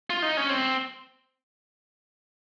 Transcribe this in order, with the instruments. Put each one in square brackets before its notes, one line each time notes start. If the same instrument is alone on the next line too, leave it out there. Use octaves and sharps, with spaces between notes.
[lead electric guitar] F4
D#4
C#4
C4